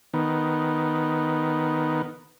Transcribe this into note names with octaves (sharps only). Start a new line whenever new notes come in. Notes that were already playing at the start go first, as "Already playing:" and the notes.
D#3 B3